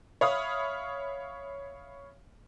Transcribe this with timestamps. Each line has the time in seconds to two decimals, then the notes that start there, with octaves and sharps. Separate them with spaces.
0.21 C#5 E5 F5 B5 D#6 F6